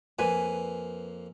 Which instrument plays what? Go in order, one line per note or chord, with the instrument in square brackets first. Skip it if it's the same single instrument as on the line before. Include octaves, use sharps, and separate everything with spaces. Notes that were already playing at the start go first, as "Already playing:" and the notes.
[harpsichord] F2 A#3 [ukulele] B4 G#5